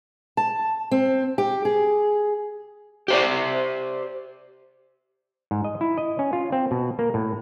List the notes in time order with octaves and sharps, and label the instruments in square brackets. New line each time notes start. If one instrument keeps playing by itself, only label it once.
[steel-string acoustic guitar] A5
C4
G4
G#4
[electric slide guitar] G4 C5 D5
[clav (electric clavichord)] G#2
D#5
E4
D#5
C#4
F4
C4
B2
A#3
A2